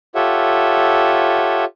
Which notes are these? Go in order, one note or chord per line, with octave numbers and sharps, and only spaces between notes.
F4 G4 A4 C#5 E5 F#5